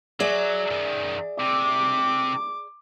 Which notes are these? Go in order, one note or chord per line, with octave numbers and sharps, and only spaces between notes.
F#3 G#4 D5 E5
F#2 D#3
C3 D6